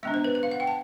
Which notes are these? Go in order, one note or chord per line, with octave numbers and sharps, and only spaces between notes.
G#3 B3 D4 E5
C5
B4
B4
F5
F#5
G5
A5